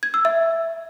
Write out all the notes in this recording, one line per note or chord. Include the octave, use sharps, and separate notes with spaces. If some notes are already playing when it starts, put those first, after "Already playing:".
G#6
E6
E5